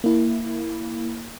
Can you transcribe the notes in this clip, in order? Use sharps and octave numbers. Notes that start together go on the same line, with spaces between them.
A#3 E4